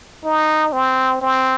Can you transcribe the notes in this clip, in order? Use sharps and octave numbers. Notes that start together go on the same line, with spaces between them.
D#4
C4
C4